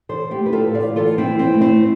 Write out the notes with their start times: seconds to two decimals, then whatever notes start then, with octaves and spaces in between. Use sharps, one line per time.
0.09 E3 A4 C5
0.31 E4 G4
0.38 A3
0.46 B4
0.52 F4 A4
0.67 A2
0.74 D5 F5
0.96 E3 F4 A4
1.18 C4 E4
1.25 E3
1.39 C4
1.54 A3
1.61 C4 E4